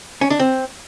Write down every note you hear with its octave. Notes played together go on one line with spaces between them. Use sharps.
C#4
D4
C4